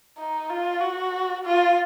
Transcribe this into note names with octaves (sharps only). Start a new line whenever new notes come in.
D#4
F4
F#4
F4